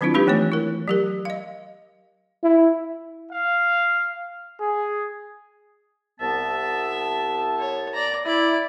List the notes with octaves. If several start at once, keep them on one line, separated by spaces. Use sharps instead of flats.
D#3 F#3 C4 D4 E4 F4
G#3 D4 D#4 F4 G4 B4
E3 A3 B3 C#5
E4 A#4
F#3 G4 A#4
D#5 F5
E4
F5
G#4
C2 B3 E5 A5
C#5
D5 A#5
E4 D5